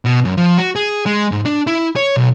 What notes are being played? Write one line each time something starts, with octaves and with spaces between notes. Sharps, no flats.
B2
F#2
F3
F#4
G#4
G#3
G#2
D4
E4
C#5
B1